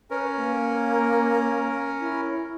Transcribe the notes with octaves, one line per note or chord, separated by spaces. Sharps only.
C#4 A#4 B4
A#3
E4